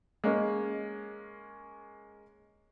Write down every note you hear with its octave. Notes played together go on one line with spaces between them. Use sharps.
G#3 A#3 C#4